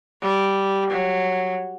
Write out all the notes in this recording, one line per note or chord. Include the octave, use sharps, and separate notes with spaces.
G3
F#3